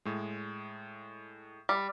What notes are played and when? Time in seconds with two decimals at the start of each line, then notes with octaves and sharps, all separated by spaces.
0.05 A2 G#3
1.69 G3